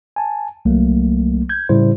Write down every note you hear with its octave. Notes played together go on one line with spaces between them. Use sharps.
G#5 A5
C2 F#3 A3 A#3
G6 G#6
A2 C#3 G3 E4 C5